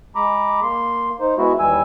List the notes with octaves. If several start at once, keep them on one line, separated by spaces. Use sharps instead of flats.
G#3 A#5 B5 D6
A#3 C6
D#4 C5
G#3 B3 E4 F#4
D#2 E3 G3 G#5 E6